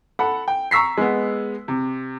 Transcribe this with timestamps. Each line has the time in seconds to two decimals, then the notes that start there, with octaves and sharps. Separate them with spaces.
0.19 A4 F#5 B5
0.48 G5
0.71 A#5 C#6 E6 B6 C7
0.98 G#3 B3
1.68 C3